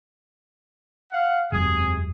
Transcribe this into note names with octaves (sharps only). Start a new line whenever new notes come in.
F5 F#5
E1 F#2 C3 G#4